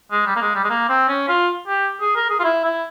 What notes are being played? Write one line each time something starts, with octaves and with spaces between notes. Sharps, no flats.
G#3
G3
A#3
G#3
G3
G#3
A#3
C4
C#4
F4
G4
G#4
A#4
G#4
F4
E4
E4